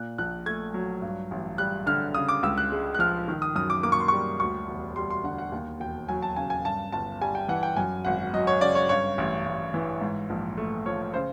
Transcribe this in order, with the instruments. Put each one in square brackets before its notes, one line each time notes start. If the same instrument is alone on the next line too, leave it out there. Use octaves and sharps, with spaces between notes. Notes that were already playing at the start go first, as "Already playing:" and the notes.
Already playing: [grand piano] A#2 F#6
A#1 F#6
A3 G#6
F#3
G2
A1
G3 F#6
D3 F6
C#3 D#6
D6
C#2 E6
F#6
G#3
F#6
F3 F6
D#3
D#6
F#2 D#6
D6
A#3 D6
C#6
C6
G3 C#6
D2 C#6
E1
G3 C6
C6
D3 F#5
F#5
D#2
E1 G5
F#3 G#5
A5
C#3 G#5
G#5
G2 A5
G1 A5
G3 G#5
G5
E3 F#5
G5
F#2 G#5
G#1 F#5
F#3 D#5
C#5
C#3 D5
C#5
G2 C#5
A1
A1
E3
G#2
A#1
A3
F3 C#5
C#3 C5